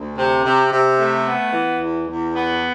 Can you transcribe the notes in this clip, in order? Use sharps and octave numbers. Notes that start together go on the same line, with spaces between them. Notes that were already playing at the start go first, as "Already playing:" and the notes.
Already playing: D2
C3
C3
C3
A3
B3
E3
E2
E2
B3